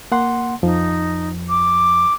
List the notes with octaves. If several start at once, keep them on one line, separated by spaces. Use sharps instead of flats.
A#3 F#5 C6
F2 F3 D#4
D6